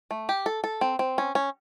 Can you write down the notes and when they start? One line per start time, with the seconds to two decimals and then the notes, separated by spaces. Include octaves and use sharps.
0.11 A3
0.29 G4
0.46 A4
0.64 A4
0.81 C4
0.99 C4
1.18 C#4
1.35 C#4